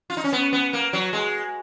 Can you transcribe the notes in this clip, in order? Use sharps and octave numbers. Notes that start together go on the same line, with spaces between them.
F4
D#4
C#4
B3
B3
A#3
F#3
G#3